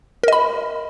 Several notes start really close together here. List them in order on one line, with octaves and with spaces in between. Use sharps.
A#4 D#5 B5